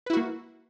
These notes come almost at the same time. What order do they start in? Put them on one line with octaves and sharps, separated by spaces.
B4 E4 F#4 A#3